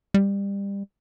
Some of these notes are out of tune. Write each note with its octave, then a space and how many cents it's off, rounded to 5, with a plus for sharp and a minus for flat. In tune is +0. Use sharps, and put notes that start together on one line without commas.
G3 +25